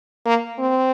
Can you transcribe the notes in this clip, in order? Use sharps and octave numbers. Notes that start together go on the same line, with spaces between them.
A#3
C4